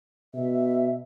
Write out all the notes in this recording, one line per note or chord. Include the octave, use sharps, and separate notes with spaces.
B2 E5